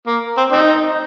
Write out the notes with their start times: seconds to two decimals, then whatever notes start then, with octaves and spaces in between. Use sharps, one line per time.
0.07 A#3
0.37 C4
0.52 C4 D#4